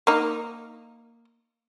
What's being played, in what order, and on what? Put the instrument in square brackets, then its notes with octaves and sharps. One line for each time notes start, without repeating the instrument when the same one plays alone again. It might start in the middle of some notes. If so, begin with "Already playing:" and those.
[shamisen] A#3 D#4